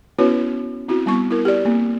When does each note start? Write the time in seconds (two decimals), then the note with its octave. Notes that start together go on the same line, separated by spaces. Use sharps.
0.19 B3 C#4 E4 F#4 B4 C#5
0.88 C4 E4 F#4
1.06 G3 B3 C#6
1.31 E4 A#4
1.45 G4 D5
1.65 A#3 C4